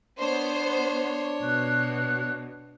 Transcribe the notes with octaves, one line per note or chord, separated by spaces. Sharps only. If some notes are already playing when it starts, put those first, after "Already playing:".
B3 D4 C5 C#5
B2 F#6